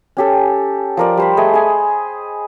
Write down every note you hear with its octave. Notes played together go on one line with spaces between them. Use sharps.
C#4 G4 A4
F3 A#4 D5
G3 C5 B5
A3 G#4 D#5
G#4 G#5